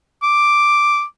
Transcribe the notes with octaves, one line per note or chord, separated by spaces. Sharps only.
D6